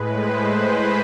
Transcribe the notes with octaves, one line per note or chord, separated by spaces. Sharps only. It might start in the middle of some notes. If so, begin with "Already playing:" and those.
Already playing: A2 G#3 B4
C5
B5